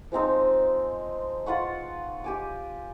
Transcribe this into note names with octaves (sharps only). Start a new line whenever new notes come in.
F3 G#3 C4 D#4
F4 B4 F#5 C#6
G4 G#5 D6